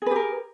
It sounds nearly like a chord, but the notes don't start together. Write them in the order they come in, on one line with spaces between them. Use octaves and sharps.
G#4 B4 G4 A#4